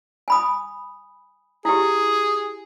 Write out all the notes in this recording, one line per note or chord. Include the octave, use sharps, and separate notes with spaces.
G#5 B5 D#6
E4 G4 G#4